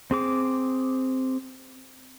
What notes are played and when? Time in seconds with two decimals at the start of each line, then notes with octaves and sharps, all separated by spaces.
0.11 C4 G#4 D6